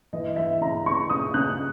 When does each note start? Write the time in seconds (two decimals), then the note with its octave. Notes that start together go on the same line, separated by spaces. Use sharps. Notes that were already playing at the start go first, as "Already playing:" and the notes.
0.13 E3 D#5
0.36 E3 E5
0.61 C#3 A#5
0.86 C#3 C#6
1.10 C#3 D#6
1.34 C#3 F#6